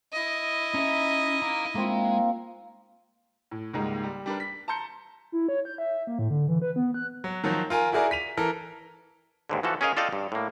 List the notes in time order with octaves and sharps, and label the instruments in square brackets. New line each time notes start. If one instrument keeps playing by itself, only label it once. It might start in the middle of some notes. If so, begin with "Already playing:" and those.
[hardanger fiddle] E4 D#5
[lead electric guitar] C#4 [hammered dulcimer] D#4 E5
[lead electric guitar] F5 A#5
[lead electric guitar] G#3 [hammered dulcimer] A#3 C4 F4
[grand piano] A2
C#2 G#2 G3 G#3 A#3
G3
G3 D4 A#4 B4
B6
A5 A#5 C6 G6 C#7
[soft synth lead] E4
C#5
G6
E5
A#3
A2
D3
E3
B4
B3
F#6
[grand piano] F#3
D#3 F3 F#3
F4 A#4 G#5
E4 F#4 G#4 A#4 D5
B6 D#7 F7
E3 A4 A#4
[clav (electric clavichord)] D#2 G#2 D3
E3 F3 F#4 A4
C#4 G#4 A#4 D#5 F5
F4 A4 D5 D#5 F5 G5
G2
A2 A#3